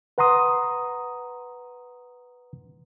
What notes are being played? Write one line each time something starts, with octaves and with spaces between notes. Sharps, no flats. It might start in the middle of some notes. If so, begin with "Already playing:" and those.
B4 F#5 A#5 C6 D#6